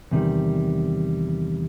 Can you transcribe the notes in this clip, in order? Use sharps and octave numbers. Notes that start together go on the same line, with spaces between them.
E2 C3 D#3 G3